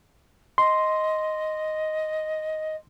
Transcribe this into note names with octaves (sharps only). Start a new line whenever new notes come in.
D#5 C6